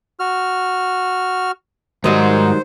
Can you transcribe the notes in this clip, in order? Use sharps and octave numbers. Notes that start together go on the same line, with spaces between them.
F#4 F6
G#2 D#3 F#3 G3 C5 D#5